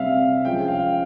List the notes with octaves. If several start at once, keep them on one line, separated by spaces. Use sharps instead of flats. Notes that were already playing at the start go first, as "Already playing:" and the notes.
Already playing: C3 G3 C4 E5 F5
F3 G#3 C#4 G5
F5